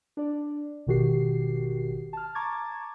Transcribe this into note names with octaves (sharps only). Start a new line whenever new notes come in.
D4 D5
G#1 B2 D#3 F#4 G4 C7
A5 F6
A5 A#5 C#6 D6 G#6 A6